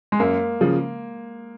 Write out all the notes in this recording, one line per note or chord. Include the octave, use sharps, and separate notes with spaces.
G#3
F#2 A#3
C#3 F3